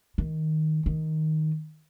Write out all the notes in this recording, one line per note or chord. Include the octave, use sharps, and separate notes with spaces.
D#3
D#3